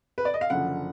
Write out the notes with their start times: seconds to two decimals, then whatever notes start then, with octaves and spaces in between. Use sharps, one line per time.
0.18 B4
0.25 D5
0.34 D#5
0.41 F5
0.50 F#1 F#2 D3 F3 F#5